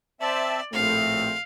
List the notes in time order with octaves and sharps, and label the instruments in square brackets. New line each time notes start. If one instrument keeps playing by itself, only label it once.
[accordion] C4 E5 A5 [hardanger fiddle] D5
[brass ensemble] A#1 A3 C4 [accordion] A2 [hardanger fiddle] F5